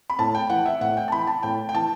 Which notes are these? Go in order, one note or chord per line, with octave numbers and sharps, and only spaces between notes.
B5
A2 A5
G5
E3 F#5
E5
A2 F#5
G5
A5
E3 B5
A5
A2 G5
G5
E3 A5